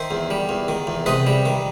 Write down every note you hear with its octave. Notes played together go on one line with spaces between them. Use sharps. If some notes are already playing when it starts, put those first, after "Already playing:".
Already playing: D#3 C5 E5
E2
G3
E2
D#3
E2
C3 B4 D#5
G3
D#3